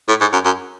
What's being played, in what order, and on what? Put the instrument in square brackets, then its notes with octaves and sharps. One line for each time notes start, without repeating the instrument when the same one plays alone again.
[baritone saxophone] A2
G#2
F#2
F#2